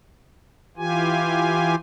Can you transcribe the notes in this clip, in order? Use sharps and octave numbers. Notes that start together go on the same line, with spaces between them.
E3 F4 G4 G#5